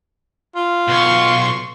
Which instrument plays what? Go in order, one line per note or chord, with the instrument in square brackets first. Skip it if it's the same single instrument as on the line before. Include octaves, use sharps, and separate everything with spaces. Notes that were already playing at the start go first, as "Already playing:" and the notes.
[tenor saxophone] F4
[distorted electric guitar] B1 [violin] C6 C#6